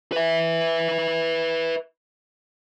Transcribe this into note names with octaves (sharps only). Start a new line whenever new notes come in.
B4 E5